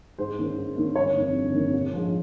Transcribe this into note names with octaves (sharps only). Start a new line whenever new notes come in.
G#2 C5
D#3 A#3 C#4
G#2
D#3 A#3 C#4
G1 C#5
F2 D#3 A#3
G1
F2 D#3 A#3
A#1
G#2 F3